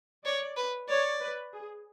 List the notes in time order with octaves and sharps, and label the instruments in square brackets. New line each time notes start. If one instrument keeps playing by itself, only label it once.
[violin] C#5 [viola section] D5
[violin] B4
[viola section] C#5 [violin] D5
[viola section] B4
G#4